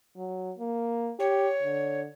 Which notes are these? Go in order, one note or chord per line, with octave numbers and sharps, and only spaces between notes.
F#3
A#3
G4 C#5
D3